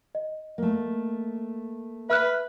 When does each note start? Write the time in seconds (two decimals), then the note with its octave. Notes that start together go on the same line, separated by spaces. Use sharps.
0.15 D#5
0.58 A3 A#3
2.10 B4 E5 F6 F#6